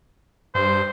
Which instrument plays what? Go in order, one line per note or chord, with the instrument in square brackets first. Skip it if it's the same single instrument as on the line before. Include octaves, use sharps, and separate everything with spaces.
[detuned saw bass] G2 [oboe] C5